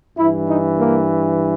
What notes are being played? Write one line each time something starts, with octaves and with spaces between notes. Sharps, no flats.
G2 E3 E4
D#4
A#3